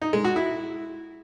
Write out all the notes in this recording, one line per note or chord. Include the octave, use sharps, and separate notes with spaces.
D#4
G#3
F#4
E4